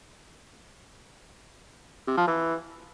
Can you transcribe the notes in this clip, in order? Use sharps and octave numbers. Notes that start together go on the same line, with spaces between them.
C3
F3
E3